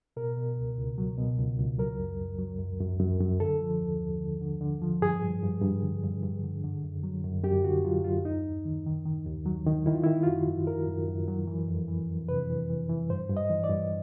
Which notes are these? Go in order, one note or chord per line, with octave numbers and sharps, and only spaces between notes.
B2 A#4
B2
C#2
C#2
F#3
B2
C#2
C#2
F#3 A#4
F#2
F#2
F#3
F#2
F#2
F#2
F#2
D3 A4
F3
D#2
D#2
D3
D3
D3
F3
G2 G#4
G2
G2
G2
D3
G2
G2
D3
D3
F#2
F#3
F#2
F#2 G4
D3 F#4
F#3 F4
F#2 F4
D#2 D#4
D#2
D#3
D#3
D#3
D#2
F#3
D#3
D#3 E4
F4
D#3 E4
F4
F#2 F#4
F#2
D#3 A#4
F#2
F#2
F#3
E3
F2
E3
F2
C3 B4
E3
E3
E3
G2 C5
G2
D#5
E3
D5
G2